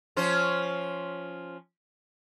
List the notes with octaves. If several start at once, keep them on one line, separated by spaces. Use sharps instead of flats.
F3 C#4 C5